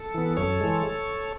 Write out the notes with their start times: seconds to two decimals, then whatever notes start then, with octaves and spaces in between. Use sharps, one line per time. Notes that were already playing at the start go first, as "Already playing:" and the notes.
Already playing: A4
0.14 E3 B3
0.37 F#2 A4 C#5
0.60 E3 G#3